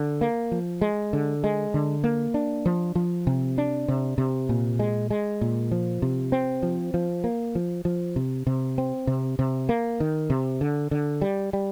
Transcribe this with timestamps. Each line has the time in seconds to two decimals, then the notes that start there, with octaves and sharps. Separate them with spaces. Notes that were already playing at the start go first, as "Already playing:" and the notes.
Already playing: D3
0.21 A#3
0.52 F3
0.81 G#3
1.13 D3
1.44 G#3
1.74 D3
2.04 A#3
2.34 D4
2.66 F3
2.95 F3
3.27 C3
3.58 D4
3.88 C3
4.18 C3
4.49 A#2
4.79 G#3
5.10 G#3
5.41 A#2
5.72 F3
6.02 C3
6.32 C4
6.63 F3
6.94 F3
7.24 A#3
7.55 F3
7.85 F3
8.16 C3
8.47 C3
8.78 C4
9.07 C3
9.39 C3
9.69 A#3
10.00 D#3
10.30 C3
10.61 D3
10.91 D3
11.22 G3
11.53 G3